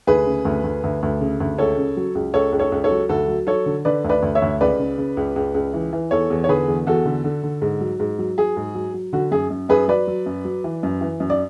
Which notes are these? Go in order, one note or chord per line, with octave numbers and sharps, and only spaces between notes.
D2 G#4 B4
C#3
D2
D2
D2
D2
C#3
D2
C#2 A4 C#5
C#3
F#3
C#2
C#2 A4 C#5
C#2
A4 C#5
C#2
A4 C#5
F#3
D2 F#4 A4
F#3
F#3 A4 C#5
D3
D3 B4 D5
D2
B4 D5
D2
C#5 E5
D2
C#2 B4 D5
C#3
C#3
C#2
C#2
C#2
E3
E3
E2 A4 C#5
E2
C#5
D3 G#4 B4
E2
E2 F#4 A4
D3
D3
D3
G#2
F#3
G#2
F#3
F#3 G#4
G#2
F#3
F#3
D3 F#4
F#2 G#4
F#2
F#2 G#4 B4
F#3 B4 D5
F#3
F#2
F#3
E3
F#2
E3
F#2
D5